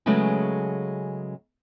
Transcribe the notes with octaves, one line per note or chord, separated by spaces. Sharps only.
C#3 F#3 G#3 A3 B3 C#4